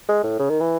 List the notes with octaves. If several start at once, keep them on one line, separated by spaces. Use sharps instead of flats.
G#3
A2
C#3
D#3
E3